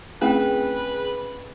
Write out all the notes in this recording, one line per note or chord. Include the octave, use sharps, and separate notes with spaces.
A3 C4 C#4 E4 G#4 B4 F5 G5